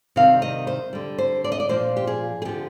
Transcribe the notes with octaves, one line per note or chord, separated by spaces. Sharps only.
C3 D#3 G3 F5
D#5
C5
D3 G3
C5
D5
D#5
D5
A#2 F3 C5
G4
G#4
G#4
D3 F3 G4